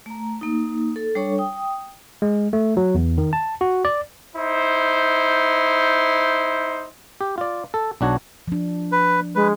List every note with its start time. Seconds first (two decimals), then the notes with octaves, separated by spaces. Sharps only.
0.06 A3 A#5
0.41 A#3 D#4
0.96 A4
1.15 G3 D4 A4 C#5 C#6
1.38 G5 D#6
2.22 G#3
2.53 A3
2.77 F#3
2.95 E2
3.18 D#3
3.33 A5
3.61 F#4
3.85 D5
4.35 D#4 E4 C5
7.21 G4
7.38 F4 D5
7.74 A4
8.01 B1 D4 F#4 C#5
8.48 F3 D4
8.92 B4
9.35 G#3 B4